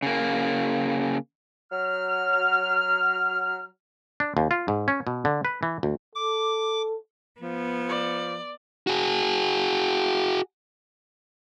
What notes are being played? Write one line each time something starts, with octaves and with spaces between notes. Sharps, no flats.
C#3 A#3
F#3 F6
D4
D#2
F4
G#2
C#4
B2
D3
B4
E3
D2
A4 D6
F3 B3
D5
F#4 G#4